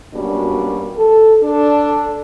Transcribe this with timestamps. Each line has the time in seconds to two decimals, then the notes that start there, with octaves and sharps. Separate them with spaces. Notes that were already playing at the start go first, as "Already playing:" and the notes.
0.14 F#2 B2 G3 A#3 D4
0.96 A4
1.42 D4 A4